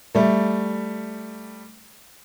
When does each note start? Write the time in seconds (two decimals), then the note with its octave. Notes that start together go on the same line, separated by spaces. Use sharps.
0.15 G3 A3